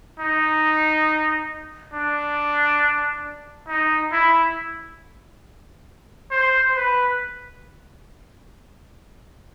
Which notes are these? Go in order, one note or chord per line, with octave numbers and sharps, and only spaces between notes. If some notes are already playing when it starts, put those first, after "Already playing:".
D#4
D4
D#4
E4
C5
B4